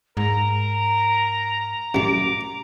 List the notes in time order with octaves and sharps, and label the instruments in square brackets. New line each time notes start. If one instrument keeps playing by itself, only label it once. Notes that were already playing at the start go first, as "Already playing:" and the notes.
[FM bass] G#2 [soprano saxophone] A#4 [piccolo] A#5
[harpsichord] A1 F#2 [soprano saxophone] D6